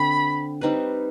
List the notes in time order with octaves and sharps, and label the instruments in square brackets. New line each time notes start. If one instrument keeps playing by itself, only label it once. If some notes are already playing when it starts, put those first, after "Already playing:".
Already playing: [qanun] D3 C4 [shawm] B5
[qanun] G3 C4 D#4 B4